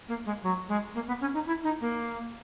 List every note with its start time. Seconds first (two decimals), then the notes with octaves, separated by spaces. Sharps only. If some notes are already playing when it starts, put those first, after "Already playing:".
0.08 A#3
0.26 G#3
0.43 F#3
0.68 G#3
0.95 A#3
1.07 B3
1.21 C#4
1.34 D#4
1.46 E4
1.63 D#4
1.81 A#3